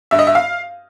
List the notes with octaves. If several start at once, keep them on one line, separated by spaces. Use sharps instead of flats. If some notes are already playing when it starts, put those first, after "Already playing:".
G2 E5
D#5
E5
F5